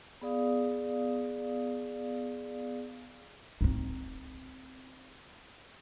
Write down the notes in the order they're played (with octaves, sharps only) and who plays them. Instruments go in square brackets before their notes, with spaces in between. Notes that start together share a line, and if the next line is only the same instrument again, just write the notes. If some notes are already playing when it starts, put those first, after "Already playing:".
[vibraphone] B3 G#4 D5 F5 D#6
[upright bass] C4 D#4